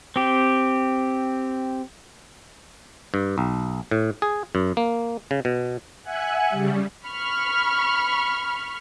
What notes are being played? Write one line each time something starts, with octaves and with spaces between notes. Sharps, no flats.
C4 G4
G2
B1
A2
G#4
F#2
A#3
C#3
B2
E5 F#5 G#5 F#6
C#3 G3
B5 C#6 F6